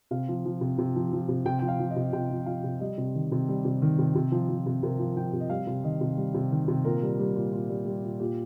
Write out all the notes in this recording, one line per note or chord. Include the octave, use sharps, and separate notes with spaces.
C3 F5
F3
F3
C3
C3
F3
F3
C3
C3 G5
F3 G5
F5
F3
D#5
C3
C3 G5
F3
F3 F5
C3
G3 D#5
C3
D#3
C3
G3
C3
D#3
C3
C3
F3
F3
C3
C3 A#4
F3
F3 G5
C3
D#5
G3 F5
C3
D#3 D#5
C3
G3
C3
D#3
C3
A#2 A#4
G3
G3
A#2
A#2
G3
G3
A#2
A#2 G4